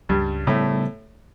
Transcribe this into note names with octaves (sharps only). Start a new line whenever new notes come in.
C#2 G2 G3
A2 C#3 G3 A3 B3